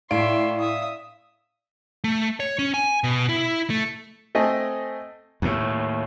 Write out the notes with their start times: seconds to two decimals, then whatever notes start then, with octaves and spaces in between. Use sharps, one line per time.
0.11 A2 D5 E5 F5 C6 D7
0.59 E5 D#6
2.04 A3
2.40 C#5
2.59 C#4
2.74 G#5
3.04 B2
3.29 E4
3.70 A3
4.35 A3 C4 D#5 G#5
5.42 D#2 A2